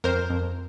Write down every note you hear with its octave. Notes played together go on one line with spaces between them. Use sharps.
F2 A#4 C5
F2